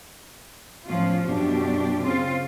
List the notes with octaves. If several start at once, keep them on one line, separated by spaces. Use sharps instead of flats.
E2 A2 F3 C#4 F4
F#2 B2 D4 G4
C#3 C4 F4